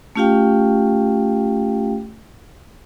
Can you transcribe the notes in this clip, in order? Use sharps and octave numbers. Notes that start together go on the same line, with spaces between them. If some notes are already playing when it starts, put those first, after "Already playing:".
A3 C#4 F4 G4 F5 G5